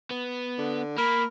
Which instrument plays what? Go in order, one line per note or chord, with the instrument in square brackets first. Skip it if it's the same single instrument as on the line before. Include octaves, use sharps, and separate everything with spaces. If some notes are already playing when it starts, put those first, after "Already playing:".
[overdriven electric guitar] B3
[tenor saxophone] D3
[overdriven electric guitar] A#3 [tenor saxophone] A#4 [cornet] B5